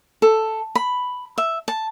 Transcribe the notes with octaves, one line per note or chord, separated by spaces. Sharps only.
A4
B5
E5
A5